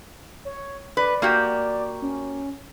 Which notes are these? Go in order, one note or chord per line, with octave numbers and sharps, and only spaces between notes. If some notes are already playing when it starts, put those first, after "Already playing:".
C#5
B4 D5
A#3 F#4 G4
C#4